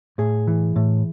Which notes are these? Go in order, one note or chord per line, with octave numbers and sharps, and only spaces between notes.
A2 G#4
E3
A2